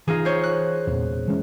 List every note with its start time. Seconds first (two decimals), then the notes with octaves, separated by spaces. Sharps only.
0.08 E3 D#4 F4 G#4
0.25 C5 C#5
0.44 F#6
0.87 E2 A#2
1.28 E3 G#3 C#4